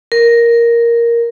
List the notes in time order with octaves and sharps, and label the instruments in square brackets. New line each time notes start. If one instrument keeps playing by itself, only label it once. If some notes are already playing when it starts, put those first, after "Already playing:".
[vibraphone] A#4